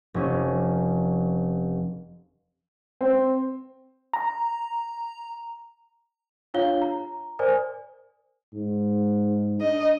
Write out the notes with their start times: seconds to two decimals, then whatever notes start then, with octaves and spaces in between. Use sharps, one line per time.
0.14 F1 C#4
3.01 C4
4.14 A#5
6.54 D4 F4 C#5 F5 G7
6.82 A#5
7.39 A#4 C5 D5 G#5
8.54 G#2
9.61 D4 D#5